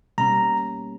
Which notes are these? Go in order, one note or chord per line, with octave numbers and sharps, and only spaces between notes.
B2 G3 A#3 C#4 A#5